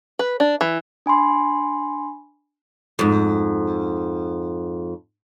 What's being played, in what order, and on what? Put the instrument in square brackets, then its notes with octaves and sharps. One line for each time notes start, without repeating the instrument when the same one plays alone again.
[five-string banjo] B4
D4
E3
[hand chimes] D4 G#5 B5 C6
[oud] F2 G#2